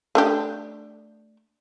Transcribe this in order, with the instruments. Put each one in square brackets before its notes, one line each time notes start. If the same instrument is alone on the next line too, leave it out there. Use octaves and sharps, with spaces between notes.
[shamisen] A3 D4 G4